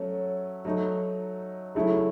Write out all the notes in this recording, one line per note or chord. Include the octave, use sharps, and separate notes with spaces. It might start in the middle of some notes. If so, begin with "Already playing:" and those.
Already playing: F#3 A3 C#4
F#3 A3 D#4
C#3 F#3 A3 E4